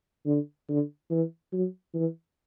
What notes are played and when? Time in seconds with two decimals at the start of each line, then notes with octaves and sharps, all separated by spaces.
0.25 D3
0.69 D3
1.10 E3
1.53 F#3
1.94 E3